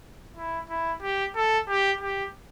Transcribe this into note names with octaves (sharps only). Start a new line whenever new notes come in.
E4
E4
G4
A4
G4
G4